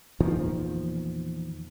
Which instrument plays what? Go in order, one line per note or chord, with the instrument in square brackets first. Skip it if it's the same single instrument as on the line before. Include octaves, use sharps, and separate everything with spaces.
[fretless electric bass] E2 A#2 D#3 F3